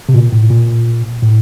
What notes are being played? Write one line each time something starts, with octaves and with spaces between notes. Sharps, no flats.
C3
A#2
A2
A#2
A2